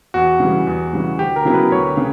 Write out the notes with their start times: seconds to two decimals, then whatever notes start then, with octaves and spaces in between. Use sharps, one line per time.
0.14 E2 F#4
0.40 C#3 E3 G3
0.67 E2
0.93 C#3 E3 G3
1.19 D2 G4
1.36 A#4
1.45 C#3 F#3 B3 E4
1.54 B4
1.72 D2 C#5
1.97 C#3